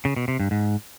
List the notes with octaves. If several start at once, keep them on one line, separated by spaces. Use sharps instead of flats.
C#3
B2
C3
G2
G#2